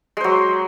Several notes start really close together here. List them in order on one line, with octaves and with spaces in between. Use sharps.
G#3 C5 F#3